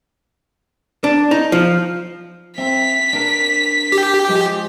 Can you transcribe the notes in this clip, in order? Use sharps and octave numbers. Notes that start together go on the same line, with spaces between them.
D4
D#4
F3
C4 E5 A#5 B6
D4 A#4
G4
F3 G#3